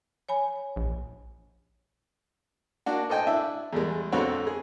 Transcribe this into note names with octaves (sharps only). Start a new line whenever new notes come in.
C#5 G#5 B5
A#1
A#3 D4 F#4
A4 C5 D#5 G5 G#5
D4 E4 E5
E2 G3 G#3
F2 D3 B3 C4 F#4 C#5
G#4